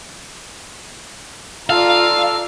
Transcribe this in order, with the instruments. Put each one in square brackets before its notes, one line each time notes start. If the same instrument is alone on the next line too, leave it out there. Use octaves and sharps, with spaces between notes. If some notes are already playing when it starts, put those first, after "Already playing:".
[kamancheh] F4 [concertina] A4 E6 [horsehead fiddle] D5 A#5 [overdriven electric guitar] F5